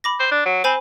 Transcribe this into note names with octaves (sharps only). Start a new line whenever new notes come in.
B5 D6 A#6
C5
D4
F#3
C4 C5 G#5 B5